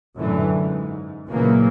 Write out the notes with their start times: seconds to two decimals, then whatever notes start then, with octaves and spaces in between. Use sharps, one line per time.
0.16 F#2 A2 D3 E3
0.52 G#2
1.28 A#2 C#3 E3 F#3 A#3 B3